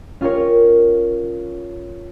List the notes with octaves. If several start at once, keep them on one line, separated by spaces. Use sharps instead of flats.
C#4 F4 G4 A#4 C#5